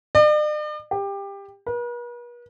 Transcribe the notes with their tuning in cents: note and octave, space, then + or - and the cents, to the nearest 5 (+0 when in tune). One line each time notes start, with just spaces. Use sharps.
D5 +45
G4 +20
B4 -45